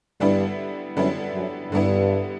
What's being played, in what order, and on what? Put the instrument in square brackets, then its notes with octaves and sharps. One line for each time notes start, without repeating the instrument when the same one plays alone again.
[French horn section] G2 [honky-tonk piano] D3 G3 B3 E4
[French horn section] F#2 [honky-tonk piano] D3 G3 B3 E4
[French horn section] F#2
[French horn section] G2 [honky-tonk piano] D3 G3 B3 E4